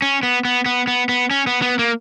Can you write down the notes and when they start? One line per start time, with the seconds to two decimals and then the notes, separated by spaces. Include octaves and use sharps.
0.02 C#4
0.23 B3
0.45 B3
0.66 B3
0.87 B3
1.09 B3
1.31 C#4
1.47 B3
1.62 B3
1.79 A#3